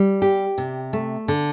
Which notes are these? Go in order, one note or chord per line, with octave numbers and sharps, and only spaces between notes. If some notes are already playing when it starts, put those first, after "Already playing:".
Already playing: G3
G4
C3
A3
D3